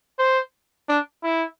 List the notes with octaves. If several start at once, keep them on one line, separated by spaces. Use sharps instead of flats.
C5
D4
E4